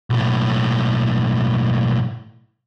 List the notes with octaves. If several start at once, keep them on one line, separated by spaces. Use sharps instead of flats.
B1 A2